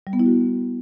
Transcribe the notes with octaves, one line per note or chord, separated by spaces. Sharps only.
G3
B3
E4
F#4